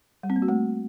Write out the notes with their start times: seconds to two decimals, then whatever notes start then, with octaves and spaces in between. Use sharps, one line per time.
0.23 G3
0.30 C4
0.36 A#3
0.42 F#4
0.48 A3